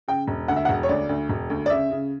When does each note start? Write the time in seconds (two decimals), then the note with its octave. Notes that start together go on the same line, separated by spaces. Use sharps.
0.08 C#3 G5
0.28 E1
0.48 D2 F#5
0.56 E5
0.65 F#5
0.69 E1
0.83 C#5
0.89 D2 D5
1.09 D2
1.29 E1
1.50 D2
1.66 D5
1.70 C#3 E5
1.91 C#3